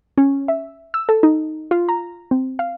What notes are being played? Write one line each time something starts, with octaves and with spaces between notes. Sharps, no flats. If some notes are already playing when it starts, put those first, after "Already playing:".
C#4
E5
E6
A4
D#4
F4
A#5
C4
F5